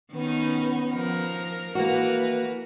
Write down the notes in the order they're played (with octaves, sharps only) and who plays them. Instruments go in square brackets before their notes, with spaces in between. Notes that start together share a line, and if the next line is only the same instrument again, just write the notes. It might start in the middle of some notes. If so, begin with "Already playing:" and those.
[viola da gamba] D#3 C#4 D#4 [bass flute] B3
[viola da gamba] F3 A#4
[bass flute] E3 [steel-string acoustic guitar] A#3 F#4 [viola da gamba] A#4 B4